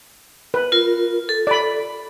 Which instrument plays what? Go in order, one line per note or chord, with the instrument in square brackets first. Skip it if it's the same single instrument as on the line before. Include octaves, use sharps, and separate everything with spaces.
[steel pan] B4
[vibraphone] F4 A#4
A4
[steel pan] D5 B5